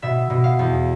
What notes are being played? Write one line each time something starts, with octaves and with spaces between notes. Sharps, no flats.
B2 E5
B2
F5
E2